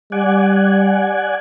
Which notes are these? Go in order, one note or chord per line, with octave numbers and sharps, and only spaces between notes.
G3 D5 F#5 G#5